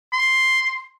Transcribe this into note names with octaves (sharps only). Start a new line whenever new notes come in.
C6